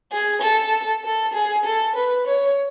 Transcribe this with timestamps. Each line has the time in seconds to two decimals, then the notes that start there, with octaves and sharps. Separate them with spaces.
0.12 G#4
0.42 A4
1.05 A4
1.34 G#4
1.66 A4
1.96 B4
2.27 C#5